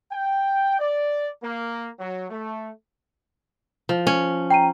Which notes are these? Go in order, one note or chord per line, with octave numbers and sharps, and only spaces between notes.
G5
D5
A#3
F#3
A3
F3
C#4
G5 A#5 D#7